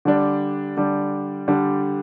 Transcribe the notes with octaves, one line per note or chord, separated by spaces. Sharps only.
D3 G3 D4
D3 G3 D4
D3 G3 D4